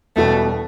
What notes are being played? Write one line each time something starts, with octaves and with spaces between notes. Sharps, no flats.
E1 E2 B2 G3 A3